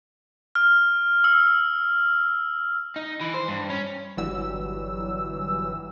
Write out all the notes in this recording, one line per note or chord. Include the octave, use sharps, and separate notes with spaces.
F6
E6
D#4
E3
C5
G2
C#4
G1 E3 F#3 G3 E6